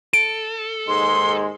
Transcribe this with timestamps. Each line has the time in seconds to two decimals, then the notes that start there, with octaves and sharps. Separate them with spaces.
0.13 A4 D7
0.88 D#2 G#2 G#3 C6